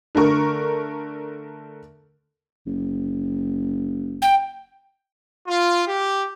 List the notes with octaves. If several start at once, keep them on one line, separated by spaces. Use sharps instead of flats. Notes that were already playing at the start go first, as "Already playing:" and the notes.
D3 A3 A#4 C#6
F#1
G5
F4
G4